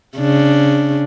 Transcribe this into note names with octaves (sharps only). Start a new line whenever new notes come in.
C#3 D4